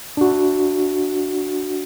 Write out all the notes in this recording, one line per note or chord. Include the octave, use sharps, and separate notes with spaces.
D4 F#4